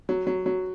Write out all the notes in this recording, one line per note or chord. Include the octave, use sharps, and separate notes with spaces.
F#3
F#3
F#3